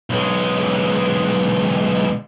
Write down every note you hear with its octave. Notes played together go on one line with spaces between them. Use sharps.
B1 G#3